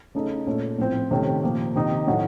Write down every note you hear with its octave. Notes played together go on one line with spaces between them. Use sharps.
C#3 A3 D#4 A4
A#2 A3 C#4 A4
A2 F3 C4
C3 D#3 A3 C#4
A#2 F3 A#3
C3 D#3 A#3 D#4
A2 F#3 A3 D#4 F#4